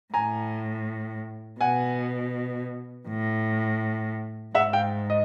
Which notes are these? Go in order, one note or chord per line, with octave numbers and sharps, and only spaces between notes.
A2 G#5 A#5
B2 F#5 G#5
A2
G#2 E5 F#5
F5 G5
D#5